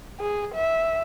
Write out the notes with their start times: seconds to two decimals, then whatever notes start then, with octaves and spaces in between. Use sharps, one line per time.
0.20 G#4
0.55 E5